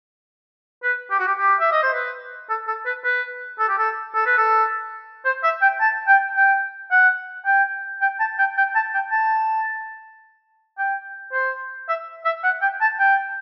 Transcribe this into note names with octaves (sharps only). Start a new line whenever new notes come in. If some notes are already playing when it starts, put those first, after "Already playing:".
B4
G4
F#4
G4
G4
E5
D#5
C5
B4
A4
A4
B4
B4
A4
G4
A4
A4
B4
A4
C5
E5
G5
A5
G5
G5
F#5
G5
G5
A5
G5
G5
A5
G5
A5
G5
C5
E5
E5
F#5
G5
A5
G5